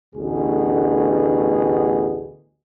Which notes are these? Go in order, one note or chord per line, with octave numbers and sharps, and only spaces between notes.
A1 D2 B2 D3 G#4